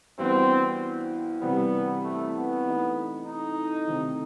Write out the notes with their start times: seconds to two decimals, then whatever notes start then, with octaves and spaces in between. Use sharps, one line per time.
0.18 G2 E3 B3 C4 F#4
1.41 C3 E3 G3 B3 C4
2.04 A3
2.34 B3
2.64 E3 A3 D#4
3.26 D#4
3.88 C3 D#3 A3